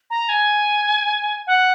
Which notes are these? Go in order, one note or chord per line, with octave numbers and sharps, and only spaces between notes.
A#5
G#5
F#5